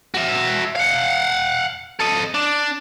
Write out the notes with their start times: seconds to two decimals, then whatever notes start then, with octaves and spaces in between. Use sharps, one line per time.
0.14 F#4 E5
0.76 F5 F#5
1.99 A4 D#5
2.35 D4